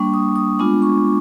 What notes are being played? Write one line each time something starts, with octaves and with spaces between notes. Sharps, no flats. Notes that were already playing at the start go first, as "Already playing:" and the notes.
Already playing: G3 A#3 D4 C#6
D#6
D#6
G#3 B3 D4 F4 D6
C#6